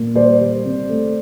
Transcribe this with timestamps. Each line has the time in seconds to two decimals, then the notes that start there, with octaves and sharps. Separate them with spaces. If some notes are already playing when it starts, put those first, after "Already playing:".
Already playing: A#2
0.15 G3 C5 D5
0.40 G3
0.65 C3
0.89 A3